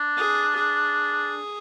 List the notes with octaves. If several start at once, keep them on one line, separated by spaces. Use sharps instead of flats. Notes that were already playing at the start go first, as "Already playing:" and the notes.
Already playing: D4
G#4
G#4